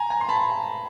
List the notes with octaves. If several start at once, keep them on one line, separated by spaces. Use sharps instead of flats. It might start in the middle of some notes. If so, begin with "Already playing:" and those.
Already playing: G#5 A#5
G#5 A#5
C6
A5 B5